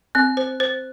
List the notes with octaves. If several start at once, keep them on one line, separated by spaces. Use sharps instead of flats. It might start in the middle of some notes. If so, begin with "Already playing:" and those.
C4 F#6
C5
C5